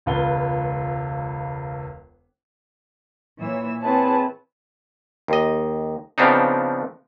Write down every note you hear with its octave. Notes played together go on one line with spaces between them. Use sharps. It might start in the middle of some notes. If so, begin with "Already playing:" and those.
E1 C#2 F4 B4 G7
A#2 E3 C#5 E6
C4 E4 G#4 B4 C#5 A5
D#2 D#5
C#3 F3 B3 C4 D4 D#4